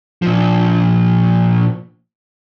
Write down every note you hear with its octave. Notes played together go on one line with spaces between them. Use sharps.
A#2 F3